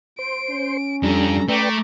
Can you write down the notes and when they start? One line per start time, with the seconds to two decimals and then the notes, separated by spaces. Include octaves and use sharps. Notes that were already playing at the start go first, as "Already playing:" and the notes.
0.19 C5 C6 D7
0.50 C#4
1.03 F2 G3 D4 A4 A#5
1.49 A3 B4 D5 G5 A#5 D6